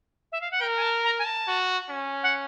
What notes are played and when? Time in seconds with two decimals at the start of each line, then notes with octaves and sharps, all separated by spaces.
0.32 E5
0.41 F5
0.51 F#5
0.61 A#4 G5
0.76 G#5
0.82 A5
1.04 A#5
1.19 G#5
1.25 A5
1.48 F#4
1.90 C#4
2.23 F#5